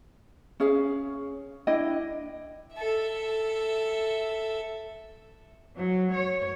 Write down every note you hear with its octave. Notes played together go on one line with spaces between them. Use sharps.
C#4 G#4 F5
D4 E4 D#5 G5
A4 E5
F#3
C#5